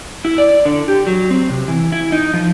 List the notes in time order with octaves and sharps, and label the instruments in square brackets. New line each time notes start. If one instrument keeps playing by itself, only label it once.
[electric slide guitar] E4
D5
D3
G4
F#3
C4
C3
E3
E4
D#4
F3